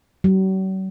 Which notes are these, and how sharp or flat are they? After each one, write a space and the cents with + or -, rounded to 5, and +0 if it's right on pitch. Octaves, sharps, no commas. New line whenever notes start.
F#3 +45